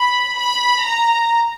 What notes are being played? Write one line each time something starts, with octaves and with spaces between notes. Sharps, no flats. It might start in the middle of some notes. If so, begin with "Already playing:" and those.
Already playing: B5
B5
A#5